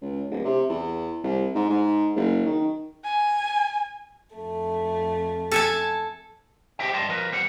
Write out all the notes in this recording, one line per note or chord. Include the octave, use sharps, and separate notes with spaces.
C#2
D1
C3
E2
C2
G#2
G#2
F#1
D#3
G#5
F2 A3
A4 G#5 A5
G4 A#4 C5 D#5 E5 G5
G2 D5 D#5 A5 C6
F3 A#4 B4
E2 G3 C5 F#5